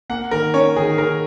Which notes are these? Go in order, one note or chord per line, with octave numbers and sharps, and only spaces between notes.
A#3 F#5
D#3 A#4
C#4 C#5
D#3 G#4
D#3 A#4